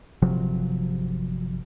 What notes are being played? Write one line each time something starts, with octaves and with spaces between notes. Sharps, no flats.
G1 C3 F3 F#3